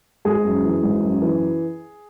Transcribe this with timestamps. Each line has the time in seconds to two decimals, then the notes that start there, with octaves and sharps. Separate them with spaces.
0.25 G#1 G#4
0.45 F#2
0.64 E3
0.83 G#1
1.02 F#2
1.21 E3